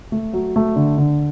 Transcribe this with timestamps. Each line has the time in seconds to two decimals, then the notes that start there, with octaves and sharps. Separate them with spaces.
0.12 A3
0.33 F#3
0.56 A3
0.76 D3
0.98 D3